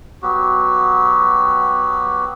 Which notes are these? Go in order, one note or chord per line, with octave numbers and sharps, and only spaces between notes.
F#3 B3 F#4 G4